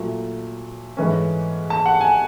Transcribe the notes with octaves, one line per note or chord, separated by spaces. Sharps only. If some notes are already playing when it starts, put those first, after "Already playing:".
Already playing: A#2 F#3 A3
G#2 E3 A3 C#4
A5
F#5
G#5